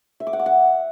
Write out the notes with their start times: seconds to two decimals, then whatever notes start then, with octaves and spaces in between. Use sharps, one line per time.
0.20 E5
0.27 D6
0.33 F#5
0.40 D6
0.46 F#5